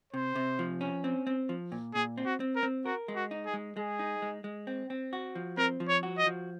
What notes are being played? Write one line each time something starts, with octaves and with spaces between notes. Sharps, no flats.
C3 C5
C3
F3
C#4
C4
C4
F3
A#2
A#2 G#4
C4
F#4
C4
A#4
C4
F#4 A#4
G#3
F#4
D#4
G#4
G#3
G#3 G#4
D#4
G#3
G#3
C4
C4
F#4
F3
C4 A#4
F3
C#5
F#4
D#5
F3